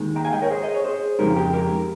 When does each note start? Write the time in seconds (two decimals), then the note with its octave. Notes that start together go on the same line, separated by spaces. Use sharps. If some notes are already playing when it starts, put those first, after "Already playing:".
Already playing: D#2 D#3 G#3
0.16 G5 A#5
0.25 F5 G#5
0.33 D#5 G5
0.42 A#4 C#5
0.51 G#4 C5
0.63 D#5
0.74 C#5
0.84 G#4 C5
1.19 F2 C#3 G#3 D#4 G4 A#4
1.36 G4
1.53 G4 A#4